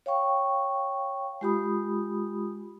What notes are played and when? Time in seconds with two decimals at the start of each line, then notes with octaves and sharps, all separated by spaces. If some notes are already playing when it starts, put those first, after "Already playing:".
0.06 C#5 F5 G5 C#6
1.41 G#3 F4 G4 B5 D#6